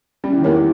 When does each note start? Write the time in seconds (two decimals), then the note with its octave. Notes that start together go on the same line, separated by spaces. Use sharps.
0.24 G3 C#4
0.32 E3
0.38 D#3
0.44 E2 E3 G4 A#4 C#5